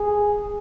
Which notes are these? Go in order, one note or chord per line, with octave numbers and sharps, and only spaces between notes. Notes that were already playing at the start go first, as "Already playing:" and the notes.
Already playing: G#4